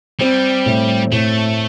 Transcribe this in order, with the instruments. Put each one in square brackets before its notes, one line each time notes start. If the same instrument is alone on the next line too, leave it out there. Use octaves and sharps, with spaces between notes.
[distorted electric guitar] G3 [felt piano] C4
[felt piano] A2
[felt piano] A2 [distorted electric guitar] A3